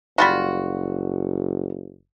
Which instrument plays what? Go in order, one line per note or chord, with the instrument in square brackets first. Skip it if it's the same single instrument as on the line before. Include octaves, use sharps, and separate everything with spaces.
[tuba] F#1 [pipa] G3 F4 F#4